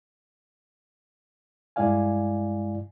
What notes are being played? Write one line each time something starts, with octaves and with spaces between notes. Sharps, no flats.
G2 G#3 E4 D5 F5 G#5